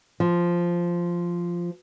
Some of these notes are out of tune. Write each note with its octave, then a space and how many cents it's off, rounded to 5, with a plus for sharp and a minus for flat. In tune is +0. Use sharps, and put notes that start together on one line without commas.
F3 -5